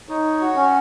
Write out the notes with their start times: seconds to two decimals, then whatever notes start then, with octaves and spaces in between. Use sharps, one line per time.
0.09 D#4 C#5
0.41 F#4
0.56 C#4